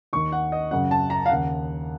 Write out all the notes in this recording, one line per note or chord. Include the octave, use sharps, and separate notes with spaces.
D#2 D#3 C#6
F#5
D#5
F#2 C#3 F#5
A5
A#5
F5
D#2 C#3 F#5